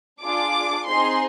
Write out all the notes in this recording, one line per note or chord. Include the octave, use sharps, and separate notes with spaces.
D4 F4 G#4 D6
C4 D#4 G#4 C6